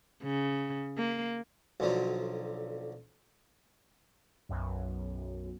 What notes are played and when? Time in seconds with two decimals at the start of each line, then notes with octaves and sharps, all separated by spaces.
0.23 C#3
0.97 A#3
1.80 B1 D3 F3 F#3
4.49 B1 F#2